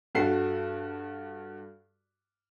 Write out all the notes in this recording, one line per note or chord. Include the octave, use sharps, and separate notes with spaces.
G2 F#4 A4 C7